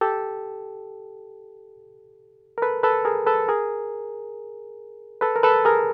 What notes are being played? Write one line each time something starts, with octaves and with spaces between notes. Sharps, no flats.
G4 A4
A#4
A4 B4
A4 B4
G#4 A#4
A4 B4
G#4 A#4
A4 B4
A#4
A4 B4
G#4 A#4